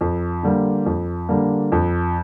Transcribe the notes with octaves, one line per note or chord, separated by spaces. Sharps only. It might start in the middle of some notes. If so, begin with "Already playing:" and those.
F2
D3 G3 A#3
F2
D3 G3 A#3
F2